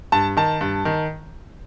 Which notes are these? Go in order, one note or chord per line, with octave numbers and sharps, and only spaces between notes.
G2 A5
D#3 A5
G2
D#3